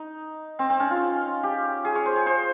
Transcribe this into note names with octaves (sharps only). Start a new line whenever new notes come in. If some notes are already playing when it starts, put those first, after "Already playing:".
Already playing: D#4
C4
C4
C#4
F4
G4
G#4
C#5
C5
C#5
C5